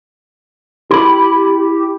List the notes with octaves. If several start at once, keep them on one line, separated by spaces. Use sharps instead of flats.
E4 G4 B5